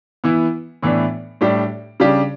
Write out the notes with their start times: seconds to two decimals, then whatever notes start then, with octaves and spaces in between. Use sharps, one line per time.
0.24 E3 B3 E4
0.83 A2 E3 B3 D4
1.41 A2 G3 D4 G4
2.00 C#3 G3 D4 G4